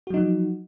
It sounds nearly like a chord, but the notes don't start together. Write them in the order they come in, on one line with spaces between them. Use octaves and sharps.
F#4 F#3 D#4 F3